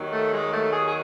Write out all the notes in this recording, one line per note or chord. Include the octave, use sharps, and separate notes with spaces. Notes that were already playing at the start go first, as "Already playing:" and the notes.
Already playing: D#2 D#3 F#3
A3
G#3
A3
G#4
G#4